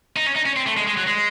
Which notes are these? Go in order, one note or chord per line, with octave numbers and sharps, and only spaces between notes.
D#4
C#4
D#4
C#4
C4
A3
G#3
G#3
F#3
G#3